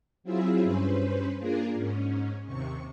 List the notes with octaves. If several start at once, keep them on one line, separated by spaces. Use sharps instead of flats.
F#3 C4 E4 F4 G#4 E5
G2 C#4 B4 C5
A#3 D4 F4 G#4 A#4
G#2 C#4
D#2 C3 C#6